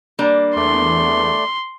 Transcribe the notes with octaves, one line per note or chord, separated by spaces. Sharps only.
G3 A#3 D4
E2 A3 D5 C6